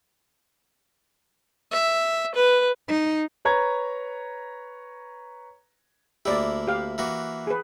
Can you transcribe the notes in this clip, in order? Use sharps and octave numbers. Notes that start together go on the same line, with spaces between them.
E5
B4
D#4
B4 C#5 A#5 G#6
D2 A#3 E4 G4 D5
G4 F5
E3 A#3 F#4
G#4 B4